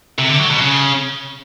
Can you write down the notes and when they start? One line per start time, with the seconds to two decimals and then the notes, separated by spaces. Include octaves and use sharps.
0.19 C3
0.29 D3
0.40 F#3
0.50 B2
0.61 C#3